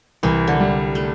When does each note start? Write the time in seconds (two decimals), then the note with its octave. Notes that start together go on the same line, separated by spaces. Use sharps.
0.23 C2 E3
0.47 D3
0.60 G3
0.95 A3